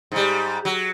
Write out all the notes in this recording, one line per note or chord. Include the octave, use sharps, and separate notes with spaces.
G#2 G3
F#3